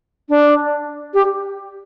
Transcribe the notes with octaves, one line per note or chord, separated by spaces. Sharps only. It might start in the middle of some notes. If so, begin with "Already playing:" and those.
D4
G4